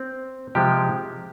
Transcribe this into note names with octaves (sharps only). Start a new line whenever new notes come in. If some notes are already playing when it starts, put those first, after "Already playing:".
Already playing: C4
C3 F3 G#3 G4